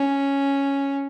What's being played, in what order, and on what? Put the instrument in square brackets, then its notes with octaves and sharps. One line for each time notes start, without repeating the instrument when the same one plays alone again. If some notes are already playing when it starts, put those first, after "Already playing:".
Already playing: [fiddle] C#4